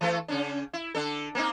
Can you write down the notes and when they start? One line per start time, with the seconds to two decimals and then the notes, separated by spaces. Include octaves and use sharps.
0.01 E3 A3 A4
0.28 C#3 C#4 D4
0.73 E4
0.94 D3 D4 A4
1.35 A#3 C4 D#4